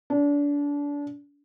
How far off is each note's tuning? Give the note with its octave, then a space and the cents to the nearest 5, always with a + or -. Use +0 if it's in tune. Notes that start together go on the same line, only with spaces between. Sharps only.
D4 -30